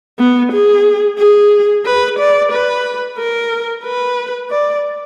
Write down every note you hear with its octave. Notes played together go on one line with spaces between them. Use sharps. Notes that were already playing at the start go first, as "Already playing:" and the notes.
B3
G#4
G#4
B4
D5
B4
A#4
B4
D5